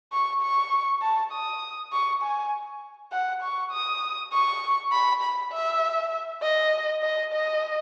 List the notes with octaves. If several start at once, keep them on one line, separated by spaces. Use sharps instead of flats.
C#6
C#6
A5
D#6
C#6
G#5
F#5
C#6
D#6
C#6
B5
B5
E5
D#5
D#5
D#5